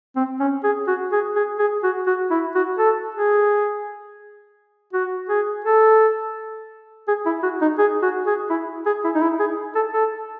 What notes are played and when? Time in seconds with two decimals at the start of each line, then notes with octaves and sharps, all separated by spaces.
0.16 C4
0.40 C#4
0.63 G#4
0.87 F#4
1.12 G#4
1.35 G#4
1.59 G#4
1.83 F#4
2.06 F#4
2.30 E4
2.55 F#4
2.78 A4
3.15 G#4
4.93 F#4
5.29 G#4
5.64 A4
7.07 G#4
7.25 E4
7.43 F#4
7.61 D#4
7.78 G#4
8.02 F#4
8.26 G#4
8.50 E4
8.86 G#4
9.04 E4
9.15 D#4
9.22 E4
9.40 G#4
9.75 A4
9.93 A4